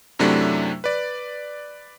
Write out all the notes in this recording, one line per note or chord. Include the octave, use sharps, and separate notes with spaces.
F#2 C3 F#3 A3 D4 E4
B4 D5